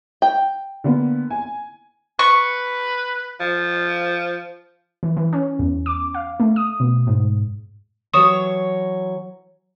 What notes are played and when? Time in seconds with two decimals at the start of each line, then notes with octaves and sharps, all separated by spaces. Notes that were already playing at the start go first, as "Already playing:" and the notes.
0.22 G5
0.84 D3 A#3 B3
1.30 G#5
2.19 B4 C#6
3.40 F3
5.03 E3
5.17 E3
5.33 C#4
5.59 E2
5.86 D6
6.14 F5
6.40 A3
6.56 D#6
6.80 B2
7.07 G#2
8.13 E3 F#3 C#5 C#6 D#6 E7